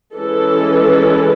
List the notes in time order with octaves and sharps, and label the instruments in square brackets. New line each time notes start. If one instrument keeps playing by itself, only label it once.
[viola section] E3 G#3 C#4 A4